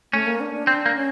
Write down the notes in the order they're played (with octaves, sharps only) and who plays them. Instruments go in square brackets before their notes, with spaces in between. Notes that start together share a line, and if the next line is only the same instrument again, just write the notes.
[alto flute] A3 [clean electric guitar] C#4
[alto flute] A#3
D4
D4
[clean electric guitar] C4 [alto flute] D4
[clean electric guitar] A#3
[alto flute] C#4